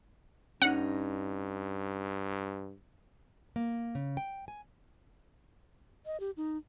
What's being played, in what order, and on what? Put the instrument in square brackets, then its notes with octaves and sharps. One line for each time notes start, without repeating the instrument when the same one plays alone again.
[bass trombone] G2 [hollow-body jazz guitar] C#4 D#4 [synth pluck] F#5
[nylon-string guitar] A#3
C#3
G5
G#5
[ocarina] D#5
G4
D#4